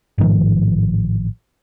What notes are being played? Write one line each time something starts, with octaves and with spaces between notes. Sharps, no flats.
A1 G#2 D#3 F3